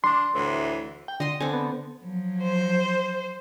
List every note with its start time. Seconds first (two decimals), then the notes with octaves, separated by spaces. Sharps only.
0.04 D4 C6
0.34 D2 A2 E3
1.08 G5
1.20 D3 D#5 C6
1.41 D3 C4 G#5
1.53 B3
2.01 F3 F#3
2.42 C5